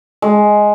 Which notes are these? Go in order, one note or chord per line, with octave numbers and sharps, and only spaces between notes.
G#3